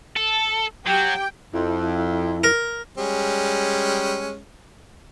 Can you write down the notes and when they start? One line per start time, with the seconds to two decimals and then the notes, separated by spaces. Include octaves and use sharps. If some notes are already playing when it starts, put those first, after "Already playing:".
0.16 A4
0.87 F#3 G4 G5
1.54 F2 E4
2.44 A#4
2.98 G3 G#3 C#4